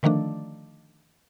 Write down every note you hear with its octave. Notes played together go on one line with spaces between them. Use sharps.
D3 D#3 F3 A3 D4